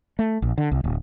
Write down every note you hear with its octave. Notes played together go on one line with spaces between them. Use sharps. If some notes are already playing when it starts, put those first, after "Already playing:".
A3
A#1
D3
C2
D1